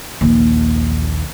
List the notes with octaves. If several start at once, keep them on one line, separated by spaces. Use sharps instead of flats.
A#1 D#2